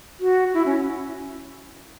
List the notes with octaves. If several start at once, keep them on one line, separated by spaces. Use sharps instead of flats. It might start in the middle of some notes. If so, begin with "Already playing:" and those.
F#4
E4
C#4